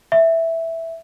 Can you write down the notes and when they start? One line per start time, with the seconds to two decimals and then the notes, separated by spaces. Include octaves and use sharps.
0.12 E5